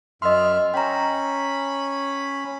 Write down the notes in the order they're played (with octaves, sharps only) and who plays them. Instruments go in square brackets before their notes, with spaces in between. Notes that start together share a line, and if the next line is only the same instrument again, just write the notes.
[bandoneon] F#2 E5 F6 [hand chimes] D#5 C6
[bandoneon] C#4 B5 [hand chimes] G5 A#5